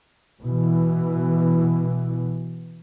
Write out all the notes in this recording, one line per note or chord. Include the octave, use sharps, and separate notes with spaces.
B2 E3